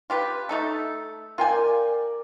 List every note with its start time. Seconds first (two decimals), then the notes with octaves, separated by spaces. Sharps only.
0.10 F4 G4 B4
0.49 A3 D#4 A4
1.38 F4 A#4 D5 G5 G#5